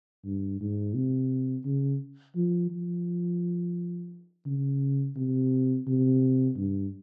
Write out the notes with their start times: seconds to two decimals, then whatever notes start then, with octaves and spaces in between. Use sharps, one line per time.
0.25 G2
0.61 G#2
0.95 C3
1.65 C#3
2.36 F3
2.71 F3
4.46 C#3
5.17 C3
5.87 C3
6.57 G2